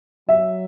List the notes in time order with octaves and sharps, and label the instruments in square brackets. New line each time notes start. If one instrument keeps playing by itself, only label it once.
[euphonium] F#3 [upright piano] E5